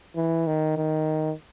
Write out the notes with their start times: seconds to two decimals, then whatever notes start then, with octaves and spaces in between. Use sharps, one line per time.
0.16 E3
0.47 D#3
0.77 D#3